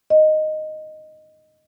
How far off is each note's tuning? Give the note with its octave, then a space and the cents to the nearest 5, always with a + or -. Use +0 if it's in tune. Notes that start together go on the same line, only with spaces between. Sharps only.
D#5 -5